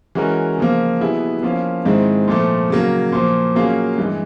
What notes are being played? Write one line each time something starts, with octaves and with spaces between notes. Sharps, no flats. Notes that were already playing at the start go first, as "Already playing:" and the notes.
E3 G#3 C#4 F#4 A#4
C#3 F3 A#3
B2 G3 B3 E4 G#4
F3 A#3 C#4 F4
G#2 D#3 G#3 C4 E4
A#2 F3 A3
C#3 F#3 A#3
A#2 F3 A#3
F#3 A#3 C#4 F4 G#4
G2 E3 G#3